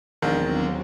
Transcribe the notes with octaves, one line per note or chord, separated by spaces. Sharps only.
E1 A#1 D#2 D#3 F#3 C4